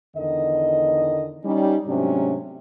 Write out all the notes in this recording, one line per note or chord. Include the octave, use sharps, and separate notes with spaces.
E2 D3 D#3 D#5
G3 C#4 D#4
G#2 C3 F#3 A3 C#4 D4